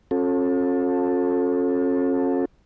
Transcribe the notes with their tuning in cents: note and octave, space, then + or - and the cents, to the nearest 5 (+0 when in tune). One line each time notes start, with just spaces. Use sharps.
C#4 -40 F4 +45 A4 +5